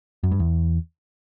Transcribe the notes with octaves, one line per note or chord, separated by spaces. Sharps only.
F#2
G2
E2